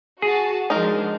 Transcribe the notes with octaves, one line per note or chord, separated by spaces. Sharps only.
F#4 G#4 A5
F3 G#3 D4 D#4 A#4